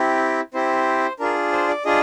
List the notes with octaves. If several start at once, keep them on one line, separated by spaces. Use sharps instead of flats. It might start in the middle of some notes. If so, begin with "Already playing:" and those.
Already playing: C4 E4 G4
C4 E4 G4 C5
D4 F4 G#4 A#4
C5
D5
D4 F4 G#4 D#5